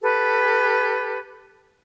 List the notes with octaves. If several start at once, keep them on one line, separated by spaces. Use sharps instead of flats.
G4 A4 B4